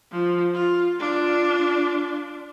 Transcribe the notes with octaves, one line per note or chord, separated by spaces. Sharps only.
F3
F4
D4 F4